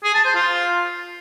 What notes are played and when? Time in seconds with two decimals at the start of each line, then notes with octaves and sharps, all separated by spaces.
0.04 G#4
0.15 A5
0.25 C5
0.35 F4